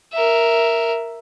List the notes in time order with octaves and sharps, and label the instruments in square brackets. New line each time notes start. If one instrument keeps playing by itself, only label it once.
[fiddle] A#4 E5